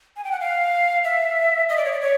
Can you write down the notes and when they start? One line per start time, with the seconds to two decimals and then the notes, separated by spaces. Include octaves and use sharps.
0.16 G#5
0.24 G5
0.32 F#5
0.40 F5
1.04 E5
1.69 D#5
1.77 D5
1.85 C#5
1.93 D5
2.01 C#5